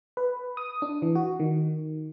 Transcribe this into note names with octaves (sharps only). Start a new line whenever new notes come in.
B4
D#6
D4
E3
F#4
D#3